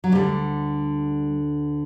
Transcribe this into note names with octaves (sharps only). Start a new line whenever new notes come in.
F#3
D2 D3 G3